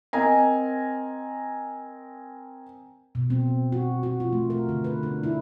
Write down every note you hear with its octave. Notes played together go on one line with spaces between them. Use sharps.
C4 A#4 D#5 G#5 A#5
B2
C4
F#4
F#4
F4
A3
A#4
D3
B4
D4
E4